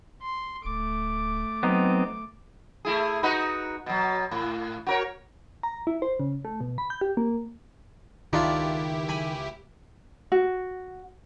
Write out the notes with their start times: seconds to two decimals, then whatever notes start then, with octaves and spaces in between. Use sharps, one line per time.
0.22 C6
0.65 D1 A3 D6
1.63 F#3 B3 C4 D#4
2.85 A3 E4 G#4
3.23 D#4 F#4 B4
3.86 B2 F#3
4.31 A2
4.86 F#4 A#4 C#5
5.63 A#5
5.87 E4
6.02 C5
6.20 C#3
6.45 A3
6.61 B2
6.78 B5
6.90 G6
7.01 G4
7.17 A#3
8.33 C#2 D#3 D4 E4 F4 G4
9.09 G#5 B5
10.32 F#4